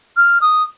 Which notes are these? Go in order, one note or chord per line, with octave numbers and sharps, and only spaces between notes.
F6
D#6